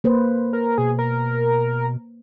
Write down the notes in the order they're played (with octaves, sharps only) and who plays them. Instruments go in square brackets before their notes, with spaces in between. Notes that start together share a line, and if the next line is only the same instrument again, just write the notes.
[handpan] A#3 B4 C5
[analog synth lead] A#4
[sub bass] B2 [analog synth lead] G#4
[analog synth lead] A#4